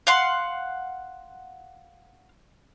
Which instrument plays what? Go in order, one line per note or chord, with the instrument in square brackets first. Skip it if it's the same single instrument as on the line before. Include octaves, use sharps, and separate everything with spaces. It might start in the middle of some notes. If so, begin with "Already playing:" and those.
[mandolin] F5 F#5 C6